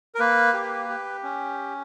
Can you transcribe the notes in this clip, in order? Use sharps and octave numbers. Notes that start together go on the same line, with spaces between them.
A#4
A#3 B4
G4
G4
C#4